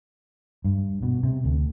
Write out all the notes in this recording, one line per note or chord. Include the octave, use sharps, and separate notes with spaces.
G2
B2
C3
D2